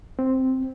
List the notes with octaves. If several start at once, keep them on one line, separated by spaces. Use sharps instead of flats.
C4